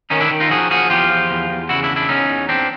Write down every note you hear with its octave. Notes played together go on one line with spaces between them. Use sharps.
D#3 C#4 D#4
D4 E4
D#3
D#4 F4
F3 F#4 G#4
F3 F#4 G#4
E2 F4 G4
F3
E2
E2
C#3 E4 F#4
D4 E4
E2
D4 E4
E2 C#4 D#4
E2
E2 C4 D4